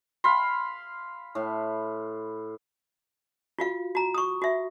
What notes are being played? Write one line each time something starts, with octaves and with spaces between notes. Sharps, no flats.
F5 B5 C6
A2
F4 F#4 F5
F#4 A#5
C#6 D#6
F#4 E5